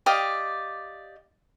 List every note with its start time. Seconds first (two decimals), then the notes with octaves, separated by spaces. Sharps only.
0.06 G4 D5 D#5 F5